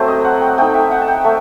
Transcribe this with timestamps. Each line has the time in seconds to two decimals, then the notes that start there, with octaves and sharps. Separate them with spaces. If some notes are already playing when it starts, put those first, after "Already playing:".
Already playing: F#3 A3 C4 C5
0.08 D#5
0.25 F#5
0.41 G5
0.58 A3 D#4 G5
0.74 E5
0.91 F#5
1.01 A5
1.08 G5
1.24 A3 E5